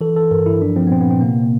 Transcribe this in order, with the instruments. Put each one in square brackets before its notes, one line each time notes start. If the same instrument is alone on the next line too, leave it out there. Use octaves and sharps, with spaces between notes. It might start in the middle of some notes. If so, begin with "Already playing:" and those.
[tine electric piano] E3 A4
E3 A4
G2 A#4
G2 E4
F3 D4
F3 C4
B3
A#2 C4
B3
A#2 C4
C3 A#3